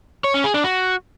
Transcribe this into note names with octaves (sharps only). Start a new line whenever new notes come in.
C#5
C#4
G#4
D4
F#4